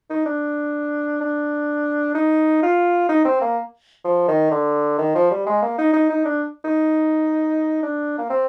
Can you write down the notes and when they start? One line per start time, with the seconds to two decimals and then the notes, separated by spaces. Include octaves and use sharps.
0.10 D#4
0.26 D4
1.21 D4
2.14 D#4
2.62 F4
3.09 D#4
3.25 C4
3.41 A#3
4.04 F3
4.28 D#3
4.51 D3
4.98 D#3
5.15 F3
5.31 G3
5.46 G#3
5.62 A#3
5.78 D#4
5.93 D#4
6.10 D#4
6.25 D4
6.64 D#4
7.83 D4
8.18 A#3
8.30 C4